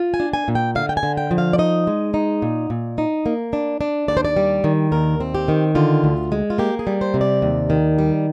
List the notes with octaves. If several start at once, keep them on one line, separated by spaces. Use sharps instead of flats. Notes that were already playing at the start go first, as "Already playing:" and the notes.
Already playing: F4
G#5
D4
G#5
A#2
G5
D3 F5
G5
G#5
D3
G5
F3
F5
D5
D#4 D#5
G#3
D#4
A#2
A#2
D#4
A#3
D4
D4
D#2 D5
C5
D5
G3
D#3
D#2 A#4
C4
G4
D#3
D3 F4
D2
G#3
F4
A#3 G4
G#4
G3
C5
C3
D5
D#2
D#3
G3